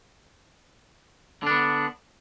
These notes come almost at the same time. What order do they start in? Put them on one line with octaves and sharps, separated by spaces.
D3 D4 B3